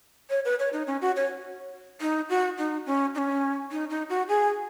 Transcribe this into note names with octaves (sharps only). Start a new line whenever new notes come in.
C#5
B4
C#5
D#4
C#4
F#4
C#5
D#4
F#4
D#4
C#4
D#4
C#4
D#4
D#4
F#4
G#4